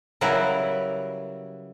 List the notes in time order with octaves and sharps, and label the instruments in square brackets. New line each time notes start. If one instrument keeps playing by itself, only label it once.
[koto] C#3 F#3 G3 E4 A#4 B4